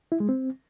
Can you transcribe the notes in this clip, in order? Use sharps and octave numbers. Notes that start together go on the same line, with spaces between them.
E4
G#3
C4